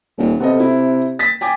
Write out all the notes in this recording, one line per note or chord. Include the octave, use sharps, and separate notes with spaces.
D#1
C3 B3 A4 D#5
E4
A6 B6
G5 G#5 D6